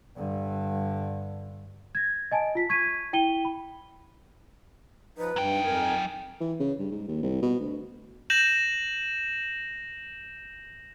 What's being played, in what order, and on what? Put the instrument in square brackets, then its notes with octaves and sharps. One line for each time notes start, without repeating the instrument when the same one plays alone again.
[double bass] G2 D3
[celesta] G#6 A#6
D#5 G#5 A5 D7
F4 B6
C#6 G#6 B6 D#7
E4 G5 D#7 G7
B5
[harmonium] F3 D#4 [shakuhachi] B4
[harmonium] G2 [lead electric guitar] F#3 G5
[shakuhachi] D#4
[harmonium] F2 A#4 G#5
[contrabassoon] E3
C#3
G2
G#2
D#2
C2
B2
D2
[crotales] G6 A#6 E7 F#7